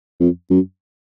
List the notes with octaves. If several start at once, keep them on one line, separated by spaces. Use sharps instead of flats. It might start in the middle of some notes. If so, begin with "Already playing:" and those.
F2
F#2